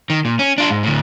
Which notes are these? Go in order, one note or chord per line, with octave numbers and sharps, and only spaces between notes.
D#3
A#2
C#4
D4 F4
G#2
D2 A2